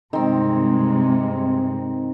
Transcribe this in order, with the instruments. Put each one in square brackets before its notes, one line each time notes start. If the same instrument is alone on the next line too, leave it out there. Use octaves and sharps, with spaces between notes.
[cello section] G2 C3 G#3 [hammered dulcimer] D#3 C4